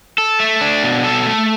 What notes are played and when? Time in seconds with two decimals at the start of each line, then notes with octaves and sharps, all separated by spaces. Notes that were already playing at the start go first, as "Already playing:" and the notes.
0.18 A4
0.40 A3
0.61 D4
0.83 B2
1.04 A4
1.26 A3